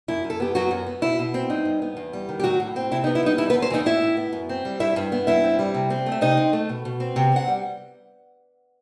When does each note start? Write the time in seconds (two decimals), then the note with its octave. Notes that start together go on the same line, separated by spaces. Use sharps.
0.08 F#2 E4
0.24 F#2
0.30 A4
0.40 B3 G4
0.55 F#2 F#3 F#4
0.71 F#2
0.87 B3
1.02 B2 E4
1.19 B2
1.34 C4
1.50 G2 D#4
1.65 G2
1.82 B3
1.97 E2
2.13 G3
2.29 D#3
2.40 G4
2.44 A2 F#3 F#4
2.60 A2
2.76 C4
2.91 C3 E4
3.04 D#4
3.07 B3
3.15 E4
3.23 G3 D#4
3.38 E2 E4
3.50 B3 B4
3.54 E2
3.62 C4 C5
3.70 E3 D#4 D#5
3.85 A2 E4 E5
4.02 A2
4.17 B3
4.33 F#2
4.49 C4
4.65 G3
4.80 G2 E4 E5
4.96 G2
5.12 B3
5.27 G2 E4 E5
5.44 C4
5.59 G3
5.74 C3
5.90 C4
6.06 A3
6.12 E5
6.21 C3 D#4 D#5
6.37 C4
6.53 A3
6.69 B2
6.85 B2
7.00 C4
7.16 C3
7.32 C4 F#5
7.48 G3